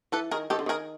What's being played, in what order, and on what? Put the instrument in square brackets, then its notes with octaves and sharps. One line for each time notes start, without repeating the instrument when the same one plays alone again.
[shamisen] E3 [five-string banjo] A4 B4
[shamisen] D#3 [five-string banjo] G#4 A#4
[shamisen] D#3 [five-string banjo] G4 A4
[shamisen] D3
[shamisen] D#3 [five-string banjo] G#4 A#4